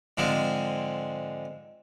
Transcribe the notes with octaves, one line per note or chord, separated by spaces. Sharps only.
G#2 D3 F3 G#3 C4